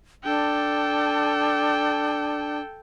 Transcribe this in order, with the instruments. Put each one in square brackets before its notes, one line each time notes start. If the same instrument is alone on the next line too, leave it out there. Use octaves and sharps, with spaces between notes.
[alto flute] D4 [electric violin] A4 G5